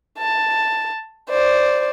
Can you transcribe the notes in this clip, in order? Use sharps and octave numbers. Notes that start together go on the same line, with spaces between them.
A5
C5 D5